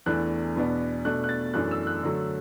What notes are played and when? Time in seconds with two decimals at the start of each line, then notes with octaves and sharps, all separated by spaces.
0.06 E2 E3 A3 D4 F#6
0.56 E2 B2 B3 D4
1.05 B2 A3 D4 F#6
1.24 F#6
1.29 A6
1.54 F#2 E3 A3 D4 F#6
1.71 E6
1.87 F#6
2.03 D3 F#3 A3